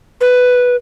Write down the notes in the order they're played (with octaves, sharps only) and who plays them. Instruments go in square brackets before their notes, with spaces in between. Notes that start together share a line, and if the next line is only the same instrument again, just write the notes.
[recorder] B4